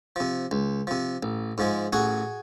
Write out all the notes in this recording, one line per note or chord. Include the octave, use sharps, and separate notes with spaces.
C3 F3
C#2
C3 F3
A1
G#2 F3 G#3
A1 F#4 G#4